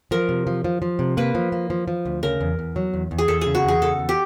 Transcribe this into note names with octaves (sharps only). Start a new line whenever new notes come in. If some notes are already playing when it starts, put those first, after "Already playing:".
F3 A#4
C3
F3
F3
F3
C3
A#3 B4
F3
A#3
F3
F3
D2
C#3 A#4
E2
E2
F#3
E2
E2
G#4
E2 A4
G#4
C#3
F#4
E2 G#4
C#3 A4
E2
G4